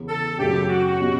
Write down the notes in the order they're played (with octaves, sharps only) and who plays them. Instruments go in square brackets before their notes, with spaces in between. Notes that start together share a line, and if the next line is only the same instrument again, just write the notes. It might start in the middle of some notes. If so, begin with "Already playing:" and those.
Already playing: [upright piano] E2 C#3 E3
[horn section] A4
[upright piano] F#2 C#3 F#3 A3 [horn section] G4
[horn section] F#4
[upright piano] B2 G3 C#4